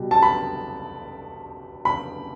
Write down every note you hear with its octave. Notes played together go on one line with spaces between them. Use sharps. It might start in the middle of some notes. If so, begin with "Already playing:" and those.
Already playing: B2 G3
A5
B5
B5